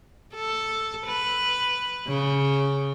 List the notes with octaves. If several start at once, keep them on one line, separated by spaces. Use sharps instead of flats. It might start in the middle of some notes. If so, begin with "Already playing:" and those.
A4
B4
C#3